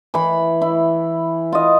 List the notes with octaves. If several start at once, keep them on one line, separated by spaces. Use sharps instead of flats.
E3 B5
E4
F4 D#5